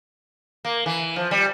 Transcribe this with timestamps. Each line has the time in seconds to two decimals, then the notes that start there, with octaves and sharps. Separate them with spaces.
0.65 A#3
0.86 E3
1.16 F3
1.31 G3